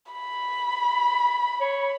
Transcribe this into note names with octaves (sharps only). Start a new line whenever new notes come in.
B5
C#5